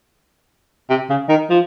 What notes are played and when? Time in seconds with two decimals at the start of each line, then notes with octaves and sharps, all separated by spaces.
0.90 C3
1.09 C#3
1.29 D#3
1.50 F3